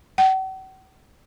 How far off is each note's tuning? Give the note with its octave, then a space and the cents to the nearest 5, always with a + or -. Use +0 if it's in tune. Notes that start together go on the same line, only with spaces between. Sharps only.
F#5 +45